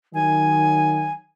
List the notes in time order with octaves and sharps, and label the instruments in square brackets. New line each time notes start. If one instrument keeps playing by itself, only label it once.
[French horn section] D#3 F#3 [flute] G#5